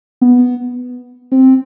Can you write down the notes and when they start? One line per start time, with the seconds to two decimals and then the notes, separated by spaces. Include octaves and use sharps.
0.21 B3
1.32 C4